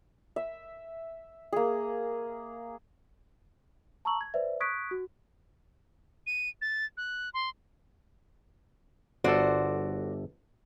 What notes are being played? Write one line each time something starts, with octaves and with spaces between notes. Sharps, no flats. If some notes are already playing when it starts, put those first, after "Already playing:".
E5
A#3 G#4
A5 A#5 C#6 E6 F#7
G#6
B4 C5 D5 E5
C#6 D#6 F#6 G#6 B6 D7
F#4
D#7
A6
F#6
C6
G1 F#4 A4 C5 D5